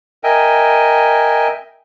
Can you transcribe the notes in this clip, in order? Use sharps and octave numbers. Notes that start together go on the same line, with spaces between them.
A#4 D#5 E5 G5 G#5